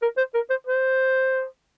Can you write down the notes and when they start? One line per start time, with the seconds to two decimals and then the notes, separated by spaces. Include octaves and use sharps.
0.02 A#4
0.18 C5
0.34 A#4
0.50 C5
0.67 C5